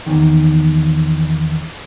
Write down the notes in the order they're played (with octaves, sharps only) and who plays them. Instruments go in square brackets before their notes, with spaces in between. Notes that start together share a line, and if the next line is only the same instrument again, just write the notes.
[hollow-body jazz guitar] E2 D#3